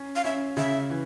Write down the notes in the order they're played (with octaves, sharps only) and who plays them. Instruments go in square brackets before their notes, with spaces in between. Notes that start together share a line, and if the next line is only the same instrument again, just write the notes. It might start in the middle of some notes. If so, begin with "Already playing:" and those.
Already playing: [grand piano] C#4
[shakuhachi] F5
[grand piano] C#4 [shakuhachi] E5
[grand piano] C#3 [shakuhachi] E5
[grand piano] E3